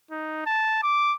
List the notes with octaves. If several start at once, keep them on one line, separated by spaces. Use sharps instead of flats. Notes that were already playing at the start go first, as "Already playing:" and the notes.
D#4
A5
D6